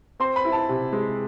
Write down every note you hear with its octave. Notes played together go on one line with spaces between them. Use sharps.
C4 C6
B5
E4
A5
C3
G#3